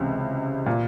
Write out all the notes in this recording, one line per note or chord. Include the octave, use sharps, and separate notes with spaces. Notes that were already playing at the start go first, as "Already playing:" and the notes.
Already playing: C#2 C3 E3
A#2